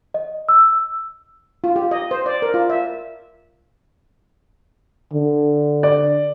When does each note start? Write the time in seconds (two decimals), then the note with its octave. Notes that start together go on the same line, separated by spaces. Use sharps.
0.14 D#5
0.49 E6
1.64 F4
1.76 G4
1.91 D#5
2.11 C5
2.26 D5
2.42 A#4
2.54 F4
2.70 E5
5.13 D3
5.83 D5